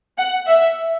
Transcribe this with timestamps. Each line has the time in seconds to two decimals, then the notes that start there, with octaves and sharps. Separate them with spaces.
0.18 F#5
0.47 E5